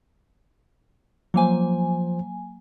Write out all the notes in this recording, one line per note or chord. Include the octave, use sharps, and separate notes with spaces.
F3 F#3 A#3 C5 G#5